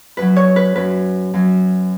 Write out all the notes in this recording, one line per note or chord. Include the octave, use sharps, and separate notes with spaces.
F#2 F#3 B4
C#5
B4
F#2 F#3 B4
F#2 F#3